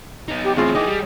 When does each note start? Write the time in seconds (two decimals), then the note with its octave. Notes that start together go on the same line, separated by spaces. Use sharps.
0.28 B3 D#4
0.44 G4
0.57 E2 A2 C4 F4 G#4 F5
0.75 E3 D#4 D#5 G5 D6
0.87 G3